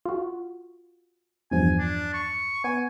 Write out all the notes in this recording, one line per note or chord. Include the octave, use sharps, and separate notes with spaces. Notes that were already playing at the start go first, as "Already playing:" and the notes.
F4 F#4
E2 G2 F3 G#5
D4
C#6
B3 G#5